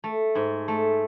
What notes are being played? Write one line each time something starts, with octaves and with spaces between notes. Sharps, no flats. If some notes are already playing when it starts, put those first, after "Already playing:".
A3
G#2
A3